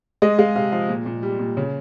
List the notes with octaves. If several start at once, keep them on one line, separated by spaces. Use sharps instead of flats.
G#3 D#5
G#3 F5
C3 F5
F3 F5
A#2
A#2
G3
A#2
C#3